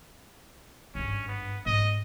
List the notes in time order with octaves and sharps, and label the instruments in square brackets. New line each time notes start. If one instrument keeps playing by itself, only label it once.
[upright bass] G#1 G2 [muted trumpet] C#4
[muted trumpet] B3
[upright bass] G#2 B3 [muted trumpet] D#5